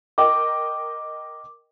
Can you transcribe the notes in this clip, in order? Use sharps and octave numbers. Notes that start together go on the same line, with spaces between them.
A#4 D#5 G5 D6